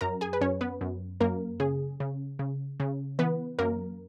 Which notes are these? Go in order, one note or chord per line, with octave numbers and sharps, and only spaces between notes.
F#2 A#4 A#5
G#4 G#5
B4
F#2 C#4 C#5
B3 B4
F#2
F#2 A#3 A#4
C#3 G#4
C#3
C#3
C#3
E3 B3 B4
F#2 A#3 A#4